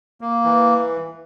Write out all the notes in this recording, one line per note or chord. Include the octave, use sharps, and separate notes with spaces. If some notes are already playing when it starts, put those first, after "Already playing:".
A#3
E3